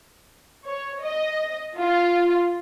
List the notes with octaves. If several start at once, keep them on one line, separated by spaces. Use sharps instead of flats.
C#5
D#5
F4